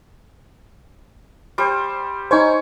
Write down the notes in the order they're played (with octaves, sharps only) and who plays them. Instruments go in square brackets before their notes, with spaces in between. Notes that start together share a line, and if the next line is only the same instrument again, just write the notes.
[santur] G3 C5
[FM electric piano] D#4 C5 [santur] C#5 G#5